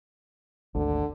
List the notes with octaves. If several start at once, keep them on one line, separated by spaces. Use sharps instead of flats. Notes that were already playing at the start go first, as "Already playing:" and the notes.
G#1 D2 D3